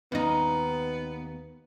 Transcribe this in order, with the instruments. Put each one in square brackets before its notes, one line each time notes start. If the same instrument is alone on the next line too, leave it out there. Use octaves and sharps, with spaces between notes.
[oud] D#2 D#4 [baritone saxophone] B3